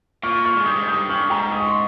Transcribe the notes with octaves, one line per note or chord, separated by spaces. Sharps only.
A#2 C#6 F6
C#6 F6
G#2
G2 D#6 G6
G#2
G2 D#6 G6
G2 C#6 F6
G#2 G5 A#5
D#6
C#6
C6